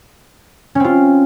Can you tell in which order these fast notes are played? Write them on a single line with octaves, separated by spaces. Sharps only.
C#4 C4 F4